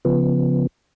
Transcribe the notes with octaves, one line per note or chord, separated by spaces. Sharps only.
C#3 F3 B3